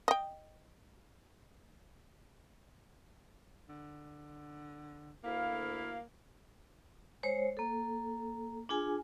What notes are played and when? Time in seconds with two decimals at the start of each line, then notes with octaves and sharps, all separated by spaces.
0.08 D#5 G5
3.69 D3
5.24 D2 A#3 E4 F5
7.23 G#3 C5 C#5
7.57 A#3 A4
8.69 D4 F4 G#4 G#5